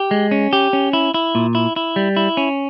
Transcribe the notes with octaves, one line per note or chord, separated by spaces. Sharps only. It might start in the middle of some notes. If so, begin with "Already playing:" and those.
Already playing: G4
G#3
C#4
G4
C#4
E4
E4
A#2
E4
E4
G3
E4
C#4